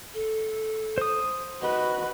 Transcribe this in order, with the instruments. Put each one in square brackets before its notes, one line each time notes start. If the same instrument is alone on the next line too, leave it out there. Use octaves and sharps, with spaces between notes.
[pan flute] A4
[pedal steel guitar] C5 D#6
[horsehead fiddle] F#4 B4 [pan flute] D#5